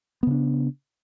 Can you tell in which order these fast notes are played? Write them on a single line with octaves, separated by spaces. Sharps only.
B3 C#3 D4